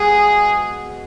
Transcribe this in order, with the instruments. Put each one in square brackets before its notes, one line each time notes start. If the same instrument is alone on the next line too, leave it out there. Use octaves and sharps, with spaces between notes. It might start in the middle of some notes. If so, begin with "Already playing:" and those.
Already playing: [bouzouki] G#3 B3 F#4 [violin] G#4